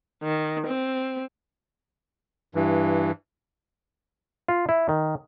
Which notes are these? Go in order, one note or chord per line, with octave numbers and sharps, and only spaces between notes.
D#3
C4
G2 E3
F4
E4
D#3